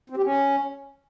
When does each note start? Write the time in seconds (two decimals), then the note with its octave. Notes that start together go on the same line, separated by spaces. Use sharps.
0.10 C4
0.17 G4
0.24 C#4